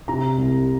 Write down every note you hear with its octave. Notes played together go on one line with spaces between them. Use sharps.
C3 A#5
C2